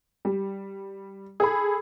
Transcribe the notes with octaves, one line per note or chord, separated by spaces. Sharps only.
G3
G#4 A4 B5